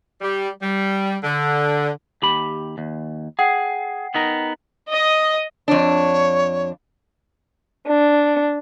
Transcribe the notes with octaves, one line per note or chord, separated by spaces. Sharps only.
G3
G3
D3
D#2 G4 B5
D#2
G#4 F#5 G5 C7
B3 D#4 A#4
D#5
F2 D4 C#5
D4